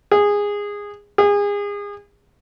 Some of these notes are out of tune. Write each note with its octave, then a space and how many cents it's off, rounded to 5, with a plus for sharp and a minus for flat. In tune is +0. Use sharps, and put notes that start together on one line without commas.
G#4 -15
G#4 -30